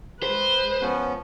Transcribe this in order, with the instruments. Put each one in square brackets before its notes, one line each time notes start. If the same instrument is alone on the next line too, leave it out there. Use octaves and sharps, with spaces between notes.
[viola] G#3 B4 [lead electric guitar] C5
[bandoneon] F3 B3 C#4